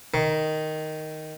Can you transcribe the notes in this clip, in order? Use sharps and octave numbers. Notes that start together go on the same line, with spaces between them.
D#3